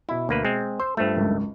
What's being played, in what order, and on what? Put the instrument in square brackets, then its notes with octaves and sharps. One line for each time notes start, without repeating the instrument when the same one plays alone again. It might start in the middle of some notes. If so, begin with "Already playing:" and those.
[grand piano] B2 E5 [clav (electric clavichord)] E4
[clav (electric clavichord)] D2 A#3 B4
G#3 C4
[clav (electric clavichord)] C5 [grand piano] E6
[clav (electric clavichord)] G2 A3 [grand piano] F4 B4 C5
[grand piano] G#1 C#2 F#2